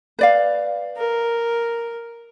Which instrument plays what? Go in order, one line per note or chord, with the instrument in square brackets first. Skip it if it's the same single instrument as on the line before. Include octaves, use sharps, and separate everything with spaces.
[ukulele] B4 D5 F5
[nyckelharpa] A#4